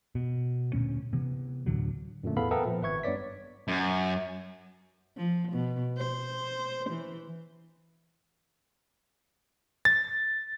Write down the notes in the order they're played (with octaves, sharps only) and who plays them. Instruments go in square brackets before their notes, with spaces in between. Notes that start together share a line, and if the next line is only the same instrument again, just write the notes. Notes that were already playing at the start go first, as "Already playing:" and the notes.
[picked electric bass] B2
D2 A#2 G#3 C#4
C3 E3 B3
D2 A2 D3 F#3
[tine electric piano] F#2 A#2 D3 A3
E2 A2 B3 A4 F5 B5
B3 A4 A#4 E5 G5 A#5
A#2 F3
G#1 B4 E5 C#6 G#6
G2 B3 C#5 D5 B6
[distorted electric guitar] F#2
[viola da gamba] F3
B2
C5
E3
[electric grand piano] A6